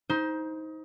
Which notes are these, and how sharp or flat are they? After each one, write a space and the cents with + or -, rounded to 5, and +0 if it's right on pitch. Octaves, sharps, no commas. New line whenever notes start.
D#4 +25 C5 +0